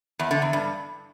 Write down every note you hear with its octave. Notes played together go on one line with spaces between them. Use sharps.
E2
D3
E2
G2